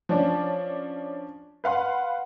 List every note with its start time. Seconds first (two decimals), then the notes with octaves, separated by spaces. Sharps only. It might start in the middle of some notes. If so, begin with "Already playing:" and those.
0.09 F3 C#4 D4
1.64 B4 F5 F#5 C6